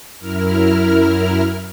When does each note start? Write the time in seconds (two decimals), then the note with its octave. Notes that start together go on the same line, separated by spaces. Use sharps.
0.18 F#2 E4 A#4 F6